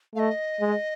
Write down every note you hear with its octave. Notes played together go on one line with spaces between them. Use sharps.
A3 D#5 F5
G#3